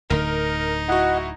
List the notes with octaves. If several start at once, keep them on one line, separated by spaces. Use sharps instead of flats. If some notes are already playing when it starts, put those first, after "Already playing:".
D1 D2 D3 D#4 A#4
E4 F#4 D#5 F#5